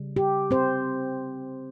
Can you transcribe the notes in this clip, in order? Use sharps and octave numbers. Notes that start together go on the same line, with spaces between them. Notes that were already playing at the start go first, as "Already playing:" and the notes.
Already playing: C#3 G3
G4
C4 C5